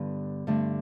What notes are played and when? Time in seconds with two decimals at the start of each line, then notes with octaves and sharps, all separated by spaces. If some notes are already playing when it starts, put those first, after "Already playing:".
Already playing: G2 D3 B3
0.47 G2 D3 A3